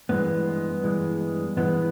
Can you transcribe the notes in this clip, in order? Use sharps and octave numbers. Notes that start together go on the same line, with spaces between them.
G2 E3 G#3 B3
G2 E3 G#3
G2 E3 G#3 B3